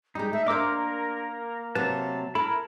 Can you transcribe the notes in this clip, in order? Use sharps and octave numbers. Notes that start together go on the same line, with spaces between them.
G3 G#3 D#4 G4
A3 E5
A#3 D4 A#4 C5 D#5 D6 E6
C3 F#3 B4 A5
E4 A4 A#4 B5